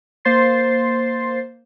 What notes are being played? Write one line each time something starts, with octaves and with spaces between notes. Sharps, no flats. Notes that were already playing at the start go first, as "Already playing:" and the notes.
A#3 C5 C6 A6 C7